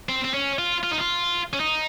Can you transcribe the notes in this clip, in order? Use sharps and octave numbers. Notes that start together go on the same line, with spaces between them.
C4
C4
C#4
F4
F4
D#4
F4
C#4
D#4